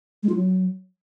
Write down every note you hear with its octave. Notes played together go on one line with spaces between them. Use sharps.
G#3
F4
F#3